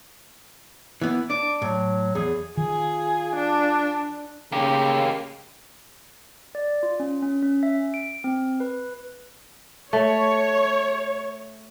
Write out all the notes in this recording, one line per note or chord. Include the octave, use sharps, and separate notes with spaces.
E3 B3
D4 D6
A2 F#3
E2 G#4
D#3 F4 G#4
D4
C#3 A#3 G4
D5
F4
C#4
C#4
C#4
E5
D7
C4
B4
A3 C#5